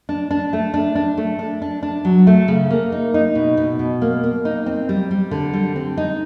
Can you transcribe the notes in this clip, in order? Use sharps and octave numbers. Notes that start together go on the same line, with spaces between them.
D4
D4
A3
D4
D4
A3
D4
D4
D4
F#3
A3
C#3
A#3
D#4
D#4
B2
B2
B2
A#3
A#3
D#4
C4
G3
G3
D3
G3
C4
D#4